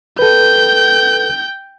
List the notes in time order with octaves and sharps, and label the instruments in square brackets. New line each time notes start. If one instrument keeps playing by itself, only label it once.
[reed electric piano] A4 B4 [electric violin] G5 G6